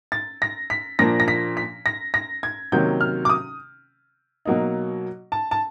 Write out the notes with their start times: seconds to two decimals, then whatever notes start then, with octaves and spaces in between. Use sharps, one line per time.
0.12 A6
0.42 A#6
0.70 B6
0.99 A#2 F3 A#3 D4 A#6
1.20 A#6
1.28 B6
1.57 B6
1.86 A#6
2.14 A#6
2.43 G#6
2.72 C3 D#3 F#3 A#3 C#4 G6
3.01 F6
3.25 D6
3.29 D#6
4.45 B2 F#3 A#3 D#4
5.32 A5
5.51 A5